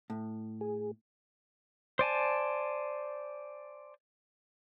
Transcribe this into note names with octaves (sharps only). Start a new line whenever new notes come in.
A2
G#4
C5 D5 G#5 A5